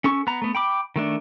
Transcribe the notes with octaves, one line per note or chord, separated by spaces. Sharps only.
C#4 A4 C#6
B3 A#5
A3 B3
G5 B5 D6
D#3 A3 D4